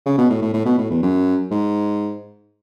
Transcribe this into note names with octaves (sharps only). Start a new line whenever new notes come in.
C#3
B2
A2
A2
A2
B2
A2
E2
F#2
G#2